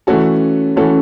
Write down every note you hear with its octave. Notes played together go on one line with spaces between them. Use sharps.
E3 A3 C#4 F#4 A4
E3 A3 C#4 F#4 A4